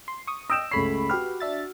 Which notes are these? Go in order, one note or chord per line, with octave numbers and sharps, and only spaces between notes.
C6
C#6 D#6
D#5 G5 E6 D7 E7
C#2 A3 C#5 B5 C7
F#4 G4 B4 F6
D4 E5 A6